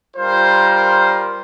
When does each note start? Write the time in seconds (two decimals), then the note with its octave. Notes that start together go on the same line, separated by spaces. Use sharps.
0.17 G3 F4 A#4 C5